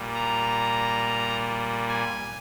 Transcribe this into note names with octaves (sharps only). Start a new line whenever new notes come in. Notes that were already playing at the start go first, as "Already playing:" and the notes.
Already playing: A#2 G3
A#5
G#5